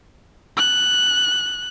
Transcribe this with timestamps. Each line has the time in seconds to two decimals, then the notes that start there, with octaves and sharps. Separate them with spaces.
0.57 F#6